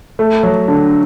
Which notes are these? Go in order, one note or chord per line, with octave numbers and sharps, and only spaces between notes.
A3
F#3
D3